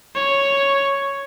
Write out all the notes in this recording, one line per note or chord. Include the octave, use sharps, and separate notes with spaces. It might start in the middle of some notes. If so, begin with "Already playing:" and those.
C#5